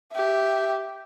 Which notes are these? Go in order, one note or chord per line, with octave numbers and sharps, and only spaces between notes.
G4 E5